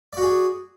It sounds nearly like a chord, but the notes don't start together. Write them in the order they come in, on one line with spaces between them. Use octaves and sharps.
D5 F#4 G#4